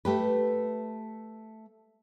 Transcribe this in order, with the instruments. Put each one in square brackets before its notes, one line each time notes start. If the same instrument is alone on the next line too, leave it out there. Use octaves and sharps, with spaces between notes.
[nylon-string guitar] A3 G4 B4